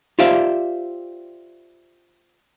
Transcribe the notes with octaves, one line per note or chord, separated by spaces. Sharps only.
F4 G4 C5 D5 E5 F5